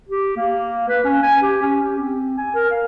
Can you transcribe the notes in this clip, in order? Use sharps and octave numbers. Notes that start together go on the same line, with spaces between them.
G4
A#3
B4
C#4
G#5
G4
C#4
G4
C4
G#5
A#4
F5